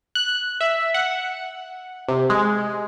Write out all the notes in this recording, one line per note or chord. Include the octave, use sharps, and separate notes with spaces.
F#6
E5
F#5
C3
G#3